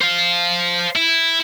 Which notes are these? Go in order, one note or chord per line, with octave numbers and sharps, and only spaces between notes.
C5 F5
E4